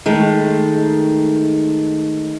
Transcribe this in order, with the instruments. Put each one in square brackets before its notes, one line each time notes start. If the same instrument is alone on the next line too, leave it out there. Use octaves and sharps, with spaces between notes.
[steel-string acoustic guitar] D#3 G#3 A3